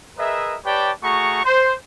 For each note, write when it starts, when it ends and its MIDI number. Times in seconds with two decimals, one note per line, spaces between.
0.18 0.56 68
0.18 0.56 70
0.18 0.56 71
0.18 0.56 75
0.18 0.56 76
0.65 0.91 67
0.65 0.91 71
0.65 0.91 73
0.65 0.91 74
0.65 0.91 79
0.65 0.91 81
1.03 1.41 57
1.03 1.41 66
1.03 1.41 68
1.03 1.41 82
1.03 1.41 85
1.44 1.73 72